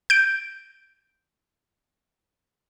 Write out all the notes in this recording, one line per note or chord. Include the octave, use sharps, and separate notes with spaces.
G6 D7